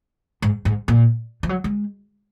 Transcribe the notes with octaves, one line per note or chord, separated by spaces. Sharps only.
G#2
G#2
A#2
F3
F#3
G#3